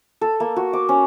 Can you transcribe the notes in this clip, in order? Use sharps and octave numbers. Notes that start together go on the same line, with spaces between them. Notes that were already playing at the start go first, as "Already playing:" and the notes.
A4
A#3
F#4
D6
C#4